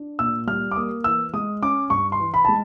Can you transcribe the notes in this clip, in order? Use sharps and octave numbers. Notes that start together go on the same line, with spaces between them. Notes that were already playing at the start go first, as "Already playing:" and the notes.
Already playing: D4
A#2 E6
G3 F6
D6
A#3 D#6
E3 E6
G#3 D#6
C#4 D6
G2 C#6
C6
E3
B5
G#3 A5